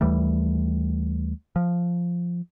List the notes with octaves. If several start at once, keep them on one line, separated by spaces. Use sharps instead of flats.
D#2 E3 G3 A3
F3